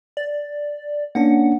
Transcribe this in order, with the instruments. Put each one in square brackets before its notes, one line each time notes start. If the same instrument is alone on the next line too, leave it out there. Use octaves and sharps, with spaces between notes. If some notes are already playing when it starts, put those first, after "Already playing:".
[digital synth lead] D5
[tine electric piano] A#3 C#4 D4 [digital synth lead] F#5